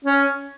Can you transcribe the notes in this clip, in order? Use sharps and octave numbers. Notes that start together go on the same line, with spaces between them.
C#4